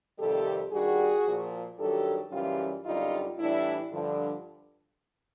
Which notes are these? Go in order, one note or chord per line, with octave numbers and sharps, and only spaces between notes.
F2 C3 D#3 G3 G4 A4
G2 D#3 G3 F#4 G#4
A#2 F3
G2 D#3 F#3 G4 A4
F#2 C#3 E3 G3 F4 G4
F#2 D3 G3 D#4 F4
A2 E3 G3 D4 E4
G2 D3 F3